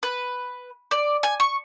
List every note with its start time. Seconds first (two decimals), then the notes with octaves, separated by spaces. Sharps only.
0.03 B4
0.91 D5
1.23 G#5
1.40 C#6